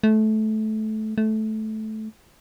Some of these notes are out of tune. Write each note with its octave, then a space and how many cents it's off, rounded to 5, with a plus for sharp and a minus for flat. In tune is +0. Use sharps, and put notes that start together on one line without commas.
A3 -20
A3 -15